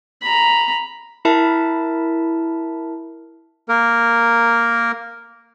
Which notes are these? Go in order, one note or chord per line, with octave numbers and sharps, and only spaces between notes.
A#5 B5
E4 A#4 E5 A5
A#3 A#4